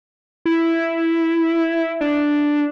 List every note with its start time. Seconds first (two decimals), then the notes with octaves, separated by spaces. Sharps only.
0.46 E4
2.01 D4